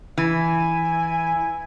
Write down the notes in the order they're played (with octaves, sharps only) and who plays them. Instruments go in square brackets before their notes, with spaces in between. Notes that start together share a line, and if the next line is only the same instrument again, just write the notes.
[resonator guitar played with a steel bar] E3 [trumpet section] E4 G#5